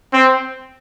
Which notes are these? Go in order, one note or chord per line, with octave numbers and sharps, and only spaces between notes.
C4